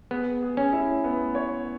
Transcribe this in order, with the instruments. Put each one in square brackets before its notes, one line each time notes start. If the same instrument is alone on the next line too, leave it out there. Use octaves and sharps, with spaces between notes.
[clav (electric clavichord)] B3 [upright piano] G#4
[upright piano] G#4
[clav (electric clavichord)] C#4
[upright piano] E4
B3
C#5